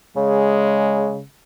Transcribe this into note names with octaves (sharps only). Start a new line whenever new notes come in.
C#3 G#3